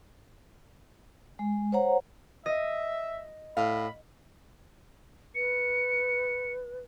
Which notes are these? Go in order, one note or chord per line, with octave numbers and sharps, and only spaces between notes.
G#3
C5 C#5 F#5 A#5
D#5 E5
A2 F5 B5
B4 C#7